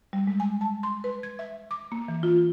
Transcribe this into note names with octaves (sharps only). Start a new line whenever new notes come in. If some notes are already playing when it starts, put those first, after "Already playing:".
G3
G#3
G#5
A5
C6
B4
G#6
E5
D6
A#3
E3
F4